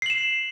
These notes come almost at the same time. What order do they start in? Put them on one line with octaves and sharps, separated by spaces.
C7 F#7 E7